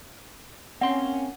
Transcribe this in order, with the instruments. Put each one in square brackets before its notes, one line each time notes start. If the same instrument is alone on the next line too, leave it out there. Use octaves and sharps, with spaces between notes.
[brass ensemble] A#3 C#4 [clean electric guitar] C4 C6 [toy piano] F#5